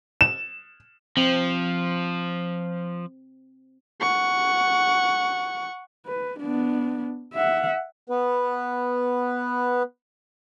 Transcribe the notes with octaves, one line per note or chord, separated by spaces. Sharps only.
E7
F3 C4
F#5 C#6
B4
B3 D4
E5 F#5
B3 B4